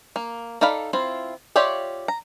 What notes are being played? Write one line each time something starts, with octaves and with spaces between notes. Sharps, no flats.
A#3
D#4 A4 D5 F5 B5
C4 E4 F4
F4 G4 C#5 D5 E5
A#5